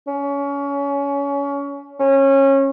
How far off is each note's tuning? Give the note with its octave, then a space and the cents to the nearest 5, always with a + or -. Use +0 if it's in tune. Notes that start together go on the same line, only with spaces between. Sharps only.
C#4 +25
C#4 -25